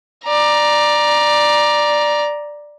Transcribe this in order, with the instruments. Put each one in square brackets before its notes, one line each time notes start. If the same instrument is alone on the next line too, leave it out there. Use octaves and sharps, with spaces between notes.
[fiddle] D5 A#5